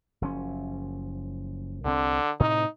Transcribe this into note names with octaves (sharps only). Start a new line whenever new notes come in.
F#1 F3 C#4
C2 D3 C4
A2 C3 D#4